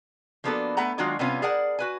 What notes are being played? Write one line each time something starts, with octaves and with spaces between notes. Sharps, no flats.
F3 A#3 B3 D4 F#4 A4
A3 B3 F#5 A#5
D#3 F#3 G#3 D4 F4 F#4
C3 G3 B3 C#4 F4
G#4 A#4 D5 F#5 A5
F#4 B4 G#5